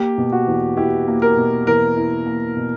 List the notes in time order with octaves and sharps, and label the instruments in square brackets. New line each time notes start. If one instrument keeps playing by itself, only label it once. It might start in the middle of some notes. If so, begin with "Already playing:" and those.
Already playing: [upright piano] A#3 [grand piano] G4
[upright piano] B2
[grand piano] F#4
[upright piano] E2
[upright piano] E4 [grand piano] G4
[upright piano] A#3
[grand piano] A#4
[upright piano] B2
[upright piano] E2 [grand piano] A#4
[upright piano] E4
A#3
B2